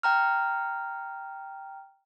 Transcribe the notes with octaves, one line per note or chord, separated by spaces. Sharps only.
G5 A#5 F6